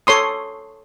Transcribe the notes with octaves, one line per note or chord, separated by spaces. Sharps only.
A4 C#5 C6 D#6